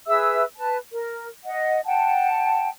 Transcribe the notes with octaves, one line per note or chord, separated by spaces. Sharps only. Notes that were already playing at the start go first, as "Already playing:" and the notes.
G#4 B4 E5 E6
B4 A5
A#4
D#5 F#5
F#5 G5 A5